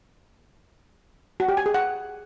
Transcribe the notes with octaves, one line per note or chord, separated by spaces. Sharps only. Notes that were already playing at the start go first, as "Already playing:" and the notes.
F#4
G4
G#5
G#4
F#5